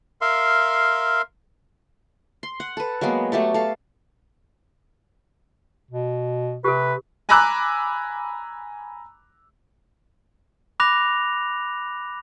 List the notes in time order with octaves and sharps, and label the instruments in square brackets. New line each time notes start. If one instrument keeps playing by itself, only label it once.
[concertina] A#4 E5 F5 C6
[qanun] C6
F#5
A4 B4
F#3 G#3 A#3 B3
F#3 A3 G4 A4
A4 F5
[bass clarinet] B2
[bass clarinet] C3 [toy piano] G4 A4 [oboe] B4
[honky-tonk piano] G#5 A#5 B5 D6 E6 F#6
[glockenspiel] B5 D6 F#6 A#6 F7